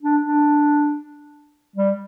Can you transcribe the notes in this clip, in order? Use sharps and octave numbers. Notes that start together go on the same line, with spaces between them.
D4
D4
G3